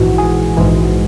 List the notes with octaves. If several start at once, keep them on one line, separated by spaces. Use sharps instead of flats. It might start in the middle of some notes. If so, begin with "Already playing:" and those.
Already playing: A#1 G#2 E3 F#4
G#4
A#1 G#2 E3